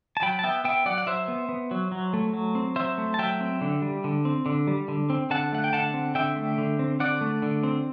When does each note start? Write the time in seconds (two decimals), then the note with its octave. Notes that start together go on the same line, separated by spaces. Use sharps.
0.17 A5
0.22 F#3 G5 B5
0.39 A5
0.43 B3 E5 G5
0.64 B3 E5 G5
0.86 F#3 D5 F#5
0.98 F#5
1.07 F#3 C5 E5
1.28 B3
1.49 B3
1.71 F#3
1.92 F#3
2.13 A3
2.33 F#3
2.55 C4
2.76 F#3 C5 E5
2.98 A3
3.14 A5
3.19 F#3 E5 G5
3.41 C4
3.61 D3
3.82 G3
4.04 D3
4.25 C4
4.46 D3
4.67 G3
4.88 D3
5.10 C4
5.30 D3 F#5 A5
5.53 A3 F#5
5.64 G5
5.73 D3 F#5 A5
5.94 C4
6.15 D3 E5 G5
6.36 A3
6.58 D3
6.79 C4
7.00 D3 D5 F#5
7.21 A3
7.42 D3
7.63 C4